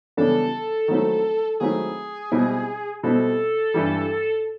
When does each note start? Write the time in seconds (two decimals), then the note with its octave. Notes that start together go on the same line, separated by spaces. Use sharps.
0.17 C#3 E3 G3 B3 D4 A4
0.88 D#3 F#3 A3 C4 E4
1.60 D#3 F#3 A3 C4 E4 G#4
2.32 B2 G3 C4 E4
3.03 B2 G3 C4 E4 A4
3.74 G2 E3 G3